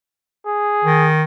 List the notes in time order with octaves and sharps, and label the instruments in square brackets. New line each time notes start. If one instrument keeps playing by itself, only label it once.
[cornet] G#4
[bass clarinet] D#3